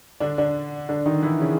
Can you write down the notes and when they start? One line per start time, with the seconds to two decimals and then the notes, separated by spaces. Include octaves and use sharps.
0.20 D3 D4
0.38 D3 D4
0.89 D3 D4
1.06 D#3 D#4
1.23 E3 E4
1.40 C#3 C#4